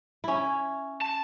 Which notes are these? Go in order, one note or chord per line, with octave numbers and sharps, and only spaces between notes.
C#4 E4
A5